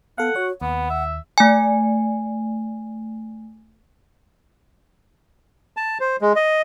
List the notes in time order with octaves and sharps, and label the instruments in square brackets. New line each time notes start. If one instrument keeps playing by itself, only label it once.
[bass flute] B3 [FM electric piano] A4 F5 [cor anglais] F#5
[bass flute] F#4 [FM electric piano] C#5
[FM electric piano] D#2 [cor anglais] B3 [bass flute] F#5
[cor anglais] E5
[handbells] A3 G#5
[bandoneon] A5
C5
G#3
D#5